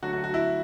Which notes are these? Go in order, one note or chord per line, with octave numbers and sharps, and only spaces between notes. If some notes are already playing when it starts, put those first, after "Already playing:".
D3 F#3 A3 F#4
F#4
F#4
E4